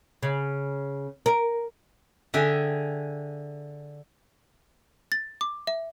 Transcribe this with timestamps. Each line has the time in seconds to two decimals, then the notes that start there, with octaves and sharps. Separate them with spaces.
0.23 C#3
1.26 A#4
2.34 D3 G#4 E5 G5
5.12 A6
5.41 D6
5.67 E5